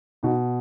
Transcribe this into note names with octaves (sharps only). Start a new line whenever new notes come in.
B2 D#4 F#4